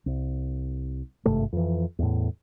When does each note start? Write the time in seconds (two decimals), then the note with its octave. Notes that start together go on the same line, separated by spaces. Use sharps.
0.06 C2
1.25 G#1 G2 C3 A3
1.53 F2 E3
1.99 E2 A2